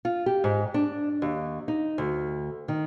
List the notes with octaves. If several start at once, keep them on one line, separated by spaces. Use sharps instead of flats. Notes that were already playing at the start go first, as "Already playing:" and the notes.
F4
G4
G#2
D4
D#2
D#4
D2
D#3